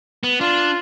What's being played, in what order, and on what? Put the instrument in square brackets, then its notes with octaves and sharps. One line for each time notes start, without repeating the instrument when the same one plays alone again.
[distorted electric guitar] B3
[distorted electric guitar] D4 [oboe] F4